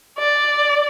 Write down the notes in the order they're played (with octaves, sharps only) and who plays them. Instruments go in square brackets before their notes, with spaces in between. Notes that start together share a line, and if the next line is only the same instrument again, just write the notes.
[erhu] D5